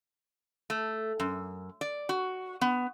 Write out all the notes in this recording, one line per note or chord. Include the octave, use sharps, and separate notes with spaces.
A3
F#2
D5
F#4
B3